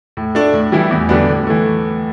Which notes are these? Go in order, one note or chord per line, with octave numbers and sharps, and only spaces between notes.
A2
A3 D4
A2
E3 G3 E4
E2
D3 G3 B3 D4
A2
E3 A3